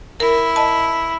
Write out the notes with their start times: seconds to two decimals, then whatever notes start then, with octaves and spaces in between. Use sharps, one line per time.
0.20 E4 A#4
0.56 D#5 A5